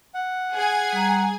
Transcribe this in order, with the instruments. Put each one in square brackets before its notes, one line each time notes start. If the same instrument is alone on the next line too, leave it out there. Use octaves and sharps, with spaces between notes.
[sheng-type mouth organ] F#5
[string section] G#4 G#5
[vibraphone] G3 A#5